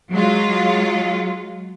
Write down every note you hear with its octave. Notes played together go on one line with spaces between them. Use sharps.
F#3 G#3 F4